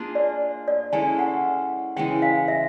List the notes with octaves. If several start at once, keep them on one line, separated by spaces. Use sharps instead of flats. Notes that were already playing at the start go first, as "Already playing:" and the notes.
Already playing: A#3 D4 F4 G#4
D5
D5
G#3 C#4 E4 A4 G#5
F#5
C#3 E3 G#3 G5
F5
E5